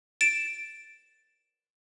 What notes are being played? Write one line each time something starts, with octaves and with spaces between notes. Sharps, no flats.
A6 D7 E7